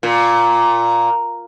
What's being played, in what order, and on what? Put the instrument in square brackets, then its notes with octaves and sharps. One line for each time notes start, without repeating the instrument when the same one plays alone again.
[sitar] A#2